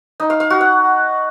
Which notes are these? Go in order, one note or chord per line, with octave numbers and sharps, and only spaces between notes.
D#4
F5
F5
F#4
F#5